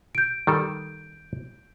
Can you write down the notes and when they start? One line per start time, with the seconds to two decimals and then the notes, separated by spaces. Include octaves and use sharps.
0.15 G6 D7
0.47 D#3 G3 A4